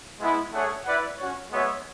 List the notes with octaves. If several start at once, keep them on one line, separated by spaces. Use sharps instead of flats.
G#3 B3 E4
A3 D4 G#4 C#5 F#5
E4 B4 D5 F#5
C#4 F#4 C#5
G#3 B3 F#4 C#5 E5